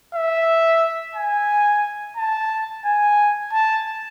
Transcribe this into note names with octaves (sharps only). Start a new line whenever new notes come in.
E5
G#5
A5
G#5
A5